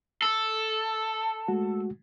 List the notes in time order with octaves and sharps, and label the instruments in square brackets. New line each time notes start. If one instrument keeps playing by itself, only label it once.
[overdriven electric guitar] A4
[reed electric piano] G#3 A3 F#4